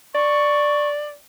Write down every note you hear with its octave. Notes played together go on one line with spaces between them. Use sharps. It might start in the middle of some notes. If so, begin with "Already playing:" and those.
D5 C#6